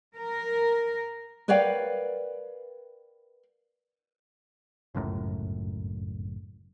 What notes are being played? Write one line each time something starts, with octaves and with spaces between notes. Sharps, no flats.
A#4
A#4 B4 C#5 D5 F5 G5
G1 C#2 F#2 A2